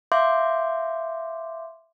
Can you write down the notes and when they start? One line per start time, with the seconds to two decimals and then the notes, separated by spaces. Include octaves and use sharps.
0.12 E5 F5 C6 D6 G6